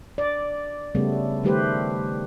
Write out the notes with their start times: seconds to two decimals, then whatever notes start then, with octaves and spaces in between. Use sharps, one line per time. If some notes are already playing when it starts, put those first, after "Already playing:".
0.18 D5
0.95 C#3 G3 A3 B3
1.43 D#3 G3 A3 G4 B4 C5